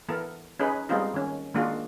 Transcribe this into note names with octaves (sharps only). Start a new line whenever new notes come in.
E3 B3 A4 A#4
C#4 D#4 G#4 B4
G3 G#3 B3 C4 D#4 F4
D#3 C#4
D#3 G#3 A#3 D4 F4 F#4